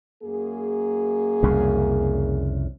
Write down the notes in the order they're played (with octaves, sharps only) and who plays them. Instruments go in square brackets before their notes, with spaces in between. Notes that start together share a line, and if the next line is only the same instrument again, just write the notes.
[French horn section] F#2 A#3 G#4
[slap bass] C2 F2 C#3